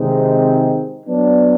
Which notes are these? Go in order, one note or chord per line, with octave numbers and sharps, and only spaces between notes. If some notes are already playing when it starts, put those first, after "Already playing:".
Already playing: C3 D#3 G#3 C4 D#4
F#3 B3 D4